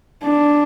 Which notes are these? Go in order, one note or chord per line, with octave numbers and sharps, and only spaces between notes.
D4